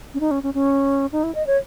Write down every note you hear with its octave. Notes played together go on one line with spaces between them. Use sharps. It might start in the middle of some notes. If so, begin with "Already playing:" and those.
C#4
D#4
C#4
C#4
C#4
D#4
E4
D#5
C#5